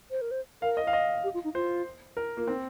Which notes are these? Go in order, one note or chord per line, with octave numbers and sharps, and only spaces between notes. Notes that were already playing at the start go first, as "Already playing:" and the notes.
C5
A#4
C5
A#4 F5
D#5
F5
D#5
G4
F4
D#4
F4 C5
A#4
A#3 F4
C4 D#4